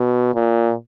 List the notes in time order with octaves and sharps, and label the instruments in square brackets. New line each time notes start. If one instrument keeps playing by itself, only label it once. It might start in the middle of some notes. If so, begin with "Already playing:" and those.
Already playing: [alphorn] B2
A#2